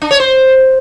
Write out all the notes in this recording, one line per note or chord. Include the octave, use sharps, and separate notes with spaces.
D4
C#5
C5